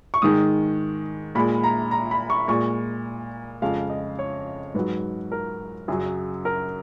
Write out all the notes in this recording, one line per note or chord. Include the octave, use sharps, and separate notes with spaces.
C#6
G#2 D#3 G#3 D#6
A#2 G#3 B5
A#5
A#5
B5
C#6
A#2 G#3 C#6
F2 C#3 G#3 F5
D#5
C#5
G#2 F#3 B4
A#4
F#2 C#3 F#3 G#4
A#4